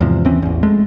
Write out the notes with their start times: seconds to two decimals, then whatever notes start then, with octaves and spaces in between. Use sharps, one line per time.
0.01 E2 G#2 C3 F3
0.25 D#2 E3 C4 C#4
0.42 A1 E2
0.63 G#3 A3